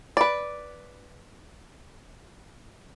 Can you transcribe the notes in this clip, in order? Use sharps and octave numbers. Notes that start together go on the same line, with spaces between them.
B4 D5